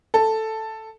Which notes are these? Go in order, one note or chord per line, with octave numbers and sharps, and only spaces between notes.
A4